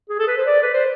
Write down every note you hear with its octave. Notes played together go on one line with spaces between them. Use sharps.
G#4
A4
B4
C5
D5
B4
C5